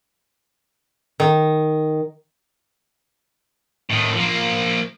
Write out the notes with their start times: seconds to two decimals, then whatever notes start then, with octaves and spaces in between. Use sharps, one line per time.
1.20 D#3
3.90 A2 D#3
4.15 F3 A#3